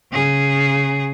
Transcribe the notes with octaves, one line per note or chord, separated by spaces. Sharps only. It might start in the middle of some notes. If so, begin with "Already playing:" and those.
C#3 G#4